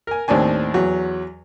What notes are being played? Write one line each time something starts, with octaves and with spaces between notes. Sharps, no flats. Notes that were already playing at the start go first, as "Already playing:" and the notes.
A#4 G#5
D#2 A2 C4 D4 G#5
E2 F#3